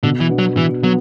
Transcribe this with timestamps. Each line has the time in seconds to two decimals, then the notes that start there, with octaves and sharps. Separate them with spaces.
0.03 B2 D3
0.20 E3
0.29 B3 D4 F#4
0.39 F#3
0.56 B2 E3
0.83 F#3 B3